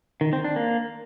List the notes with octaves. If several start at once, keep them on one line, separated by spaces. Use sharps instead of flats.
D#3
C4
D4
A#3